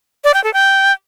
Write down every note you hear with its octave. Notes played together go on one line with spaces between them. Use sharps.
D5
G5
A4
G5